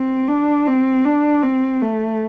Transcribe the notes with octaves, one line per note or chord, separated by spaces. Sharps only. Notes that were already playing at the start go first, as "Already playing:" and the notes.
Already playing: C4
D4
C4
D4
C4
A3